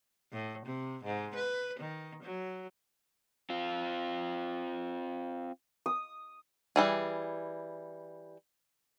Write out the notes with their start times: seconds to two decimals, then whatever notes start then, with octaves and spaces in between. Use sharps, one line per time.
0.32 A2
0.66 C3
1.04 G#2
1.35 B4
1.80 D#3
2.23 F#3
3.50 C4 F4
5.86 D#6
6.76 E3 G3 G#4